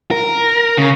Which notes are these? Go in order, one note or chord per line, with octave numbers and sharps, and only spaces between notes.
A#4
C#3